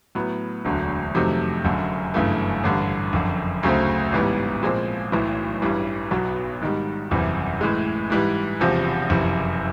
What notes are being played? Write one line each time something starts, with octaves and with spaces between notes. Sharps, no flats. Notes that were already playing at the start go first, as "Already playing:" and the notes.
A2 F#3 B3
E1 D2 D3 F#3
F2 C3 D#3 F#3 A3
F#1 F#2 D3
G1 F#2 C#3 E3 A3
A1 G2 D3
F#1 F2 D3
D2 C#3 F#3 A3 C4
A1 G#2 E3 G3 B3
A#2 F3 G#3 C4
B1 A2 E3
A1 G2 E3 G3
B1 B2 F#3 B3
G#2 D#3 G3
F#1 E2 C3 E3 G3
A2 E3 G#3
G#2 E3 G3
E1 E2 C3 F3
F#1 F2 C3 E3